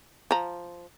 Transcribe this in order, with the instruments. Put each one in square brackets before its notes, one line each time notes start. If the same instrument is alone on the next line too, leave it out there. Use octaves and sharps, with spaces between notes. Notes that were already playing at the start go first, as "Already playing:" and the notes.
[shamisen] F3 A#5